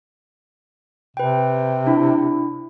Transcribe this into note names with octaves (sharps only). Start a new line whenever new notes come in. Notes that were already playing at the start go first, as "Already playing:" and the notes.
C3 B4 G5
D4 E4